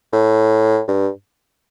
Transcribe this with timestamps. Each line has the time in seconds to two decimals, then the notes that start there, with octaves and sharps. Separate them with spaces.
0.13 A2
0.88 G2